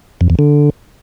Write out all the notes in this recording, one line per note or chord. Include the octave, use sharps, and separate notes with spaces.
F2
E2
D3